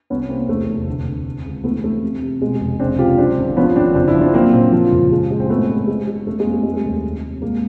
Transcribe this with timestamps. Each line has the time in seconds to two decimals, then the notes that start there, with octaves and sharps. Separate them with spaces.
0.10 C2 B3 C#4
0.29 C3 A#3 C4
0.48 E2 A3
0.67 F1
0.88 D2
1.07 D2
1.26 C3
1.46 C#2
1.64 E3 A3 B3
1.84 F2 A3
2.02 C3
2.21 C3
2.42 B2 G#3
2.61 F1
2.80 C#2 C4 D4
2.99 C#2 F4 G4
3.18 F#2 C4 D4
3.37 G#1
3.56 F3 B3 C#4
3.76 G#1 C4 D4
3.95 F#1 C4 D4
4.08 D4 E4
4.14 F3
4.21 C4 D4
4.34 F#3 A#3 C4
4.53 A#2
4.72 F3
4.92 F#1
5.12 G#3
5.31 G#3
5.40 C4
5.50 A2 A3 B3
5.69 A2
5.88 G#3
6.08 G#3
6.27 F2 A3
6.39 G#3 A#3
6.46 F2
6.52 A3
6.63 G3 G#3
6.74 A3
6.85 D#2
7.04 F2
7.23 C3
7.42 G#2 G#3 A#3